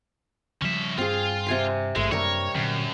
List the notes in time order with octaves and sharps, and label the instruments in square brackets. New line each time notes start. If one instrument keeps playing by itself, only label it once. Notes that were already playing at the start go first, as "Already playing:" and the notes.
[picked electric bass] C#3 F3 G3 [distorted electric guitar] C#4 E5
[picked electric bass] G2 [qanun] C4 G#4 [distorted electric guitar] F4
[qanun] C3 G#5 C6
[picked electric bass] G#1 G2 [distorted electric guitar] G#3 [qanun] A3
[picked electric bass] F#2 A#3 D4 [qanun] G3 A#4 [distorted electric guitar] C#5
[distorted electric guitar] F#2 [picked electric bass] A#2 D3 F#3